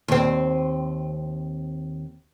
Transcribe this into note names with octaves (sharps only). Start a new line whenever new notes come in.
D#2 C4